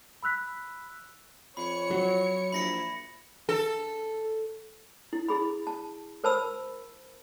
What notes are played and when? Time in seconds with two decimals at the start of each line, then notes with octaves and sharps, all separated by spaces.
0.23 B5 E6 F#6 B6
1.57 F2 C#5 B5 C#7
1.91 F#3
2.52 A#1 E4 B5 A#6 C#7
3.49 A4
5.13 E4
5.29 E4 G#4 B5
5.67 A5
6.24 A#4 C5 A5 B5 E6